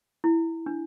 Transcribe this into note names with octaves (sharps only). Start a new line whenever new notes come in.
E4
D4